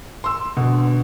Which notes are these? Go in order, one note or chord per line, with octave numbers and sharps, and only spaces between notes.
C6 E6
B2 D3